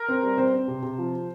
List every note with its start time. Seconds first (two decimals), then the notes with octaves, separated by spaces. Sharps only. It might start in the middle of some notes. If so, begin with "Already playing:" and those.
Already playing: A#4
0.08 C4
0.23 G3
0.38 C4 C5
0.53 C4
0.68 C3
0.83 C3
0.98 F3